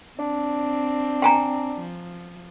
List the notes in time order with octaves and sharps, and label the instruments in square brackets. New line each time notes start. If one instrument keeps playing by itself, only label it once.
[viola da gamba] C4 [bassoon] D4
[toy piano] G5 G#5 A#5
[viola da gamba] F3